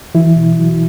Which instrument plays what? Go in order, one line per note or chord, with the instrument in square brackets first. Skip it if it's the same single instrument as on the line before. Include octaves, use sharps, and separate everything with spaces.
[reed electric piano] E3 F#3 E4
B2
F#3